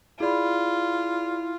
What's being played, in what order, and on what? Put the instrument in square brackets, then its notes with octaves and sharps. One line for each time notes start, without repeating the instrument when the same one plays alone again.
[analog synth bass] E4 [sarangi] F4 [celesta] G#4 D5 B5